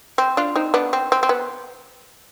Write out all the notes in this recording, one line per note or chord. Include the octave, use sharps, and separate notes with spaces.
C4
D4 F4
C4 D#4
B3 D4
C4
C4
C4
B3